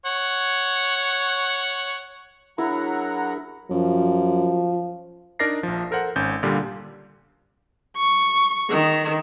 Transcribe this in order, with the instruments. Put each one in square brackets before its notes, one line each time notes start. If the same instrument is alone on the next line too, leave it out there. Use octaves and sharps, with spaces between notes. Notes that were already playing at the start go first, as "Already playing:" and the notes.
[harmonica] C#5 F#5
[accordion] F#3 F#5 A#5 [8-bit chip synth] D4 G#4 A#4 [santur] E4
[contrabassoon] F#2 [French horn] F3
[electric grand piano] D4 D#4 A#4 D5 A#6 C7
A#1 F3
A4 A#4 C5 F#5
G#1 C#4 G6
A#2 D3 G3 F4
[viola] C#6
D#3